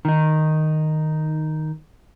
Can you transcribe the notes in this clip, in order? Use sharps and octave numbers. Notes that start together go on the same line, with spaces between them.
D#3 D#4